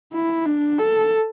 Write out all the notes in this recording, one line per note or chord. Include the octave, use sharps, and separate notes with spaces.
E4
D4
A4